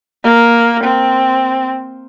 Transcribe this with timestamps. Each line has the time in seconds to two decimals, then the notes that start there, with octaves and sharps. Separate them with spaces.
0.24 A#3
0.84 C4